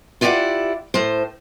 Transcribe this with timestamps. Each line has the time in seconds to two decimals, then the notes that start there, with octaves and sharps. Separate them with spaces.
0.21 E4 F4 G4 C#5 D5 F#5
0.94 A2 C5